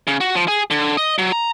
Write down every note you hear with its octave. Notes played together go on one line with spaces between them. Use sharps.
C#3
F#4
F3
G#4
D3
D#5
F#3
A#5